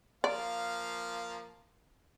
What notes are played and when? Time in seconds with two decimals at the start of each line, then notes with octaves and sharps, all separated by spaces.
0.24 F3 A#3 D5 F5